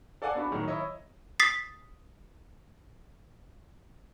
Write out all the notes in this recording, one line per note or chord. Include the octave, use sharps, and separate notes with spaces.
A4 D5 F5 F#5 G#5
B3 D4 F#4 B5
A2 D#3 F#3
E4 C#5 D#5
D#6 A6 B6 C7